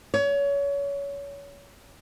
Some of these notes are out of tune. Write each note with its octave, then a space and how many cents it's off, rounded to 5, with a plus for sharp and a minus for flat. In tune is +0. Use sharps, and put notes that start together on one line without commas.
C#5 +25